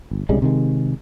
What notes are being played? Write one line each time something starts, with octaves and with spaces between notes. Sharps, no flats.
G1
C2 C#3 G3 G#3
C3 D#3 G#3